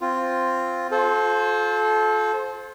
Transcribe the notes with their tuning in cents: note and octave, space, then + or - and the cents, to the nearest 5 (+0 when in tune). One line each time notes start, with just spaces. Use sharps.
C4 +0 F4 +0
F4 +30 A4 -30 C5 +5